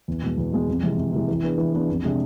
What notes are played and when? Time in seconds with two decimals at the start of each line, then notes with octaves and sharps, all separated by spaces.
0.08 E2
0.23 B2 G#3
0.38 E2
0.52 B2 G#3
0.68 F2
0.83 C3 E3 G#3
0.98 F2
1.13 C3 E3 G#3
1.28 E3
1.43 B3 D4 G#4 B4
1.58 E3
1.73 B3 D4 G#4 B4
1.89 F2
2.03 C3 G#3 D4 G#4